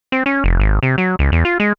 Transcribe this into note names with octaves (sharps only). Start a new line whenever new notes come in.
C4
C#4
F1
G#1
C3
F#3
C#2
E2
F4
G#3